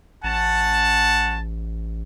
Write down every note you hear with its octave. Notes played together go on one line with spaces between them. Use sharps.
A1 C#4 F#5 A5